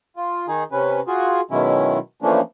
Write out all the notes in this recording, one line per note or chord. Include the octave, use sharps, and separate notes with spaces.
F4
D#3 D#4 G#4
C3 C#4 B4
F4 F#4 G#4
B2 D#3 F#3 G#3 C#4 E4
E3 F3 A3 A#3 C#4 D4